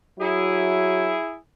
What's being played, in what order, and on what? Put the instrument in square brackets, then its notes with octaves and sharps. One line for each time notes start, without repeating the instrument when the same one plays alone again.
[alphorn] F#3 [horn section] E4 G#4